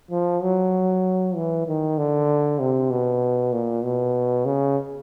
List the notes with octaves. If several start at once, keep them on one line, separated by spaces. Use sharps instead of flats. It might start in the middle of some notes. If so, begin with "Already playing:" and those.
F3
F#3
E3
D#3
D3
C3
B2
A#2
B2
C#3